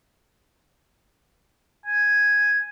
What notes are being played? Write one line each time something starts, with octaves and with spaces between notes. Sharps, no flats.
G#5